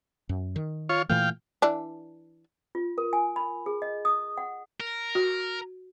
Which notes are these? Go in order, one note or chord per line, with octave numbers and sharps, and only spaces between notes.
F#2
D#3
F4 C#5
A#2 E3 A3 F5 G5
E3 D4
F4
A#4
G#5
B5
G#4
D#5
D#6
F#5
A#4
F#4